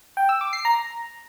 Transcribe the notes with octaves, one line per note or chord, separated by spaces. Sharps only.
G5
E6
D6
C7
A#5